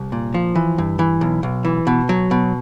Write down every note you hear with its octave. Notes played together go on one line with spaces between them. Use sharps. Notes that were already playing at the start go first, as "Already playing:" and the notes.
Already playing: C2
A#2
F3
E3
G2
E3
B1
B1
E3
B2
F#3
B2